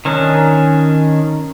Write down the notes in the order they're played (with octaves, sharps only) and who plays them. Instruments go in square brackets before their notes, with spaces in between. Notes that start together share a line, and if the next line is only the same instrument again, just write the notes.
[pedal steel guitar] D#3 C#4 D4